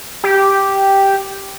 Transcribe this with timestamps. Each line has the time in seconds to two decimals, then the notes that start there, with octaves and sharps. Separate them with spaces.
0.24 G4